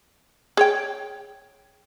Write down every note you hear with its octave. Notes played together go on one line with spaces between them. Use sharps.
G#4 C#5 G5